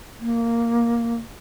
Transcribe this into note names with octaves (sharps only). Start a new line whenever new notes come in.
A#3